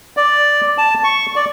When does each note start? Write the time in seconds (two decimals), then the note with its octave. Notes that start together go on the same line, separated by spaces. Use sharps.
0.17 D5
0.78 A5
1.04 C#6
1.36 D5